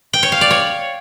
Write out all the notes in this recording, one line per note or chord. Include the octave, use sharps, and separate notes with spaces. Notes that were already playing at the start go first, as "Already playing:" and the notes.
G5
C#5
F5
D5
C#5